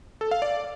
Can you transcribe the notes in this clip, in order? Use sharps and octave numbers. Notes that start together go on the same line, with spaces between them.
A4
F5
D5